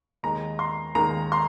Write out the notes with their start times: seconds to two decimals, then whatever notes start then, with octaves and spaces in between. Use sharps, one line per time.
0.23 D#2 D#3 G#3 A#5
0.59 C6
0.95 D#2 D#3 G#3 A#5
1.32 C6